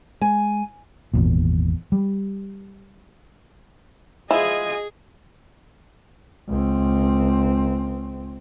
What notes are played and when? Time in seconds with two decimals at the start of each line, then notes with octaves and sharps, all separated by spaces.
0.21 G#3 G#5
1.14 G#1 E2 A#2
1.92 G3
4.31 F3 G#3 E4 G#4 D#5 G#5
6.49 C#2 C4